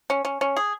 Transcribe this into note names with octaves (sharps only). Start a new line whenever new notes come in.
C#4
C#4
C#4
G#4